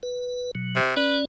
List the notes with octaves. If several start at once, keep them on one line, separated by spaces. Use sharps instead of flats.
B4
B2 F#3
C3
C#4 B4 D5